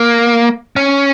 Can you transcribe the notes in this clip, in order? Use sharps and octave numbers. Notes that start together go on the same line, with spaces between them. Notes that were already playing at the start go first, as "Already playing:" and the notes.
Already playing: A#3
C#4